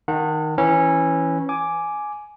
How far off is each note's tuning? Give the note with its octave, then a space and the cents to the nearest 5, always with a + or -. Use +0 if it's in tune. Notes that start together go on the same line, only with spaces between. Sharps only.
D#3 +0 F#5 -30 A5 +40
E3 +0 C#4 -15 B5 -30
G#5 +10 D6 +0